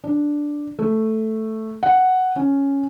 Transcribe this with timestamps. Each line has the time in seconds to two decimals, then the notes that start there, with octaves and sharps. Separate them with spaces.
0.04 D4
0.79 A3
1.83 F#5
2.36 C#4